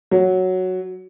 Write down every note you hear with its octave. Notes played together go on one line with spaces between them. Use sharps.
F#3